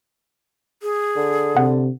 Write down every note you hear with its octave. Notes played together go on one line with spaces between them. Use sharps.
G#4
D3
C3 F#5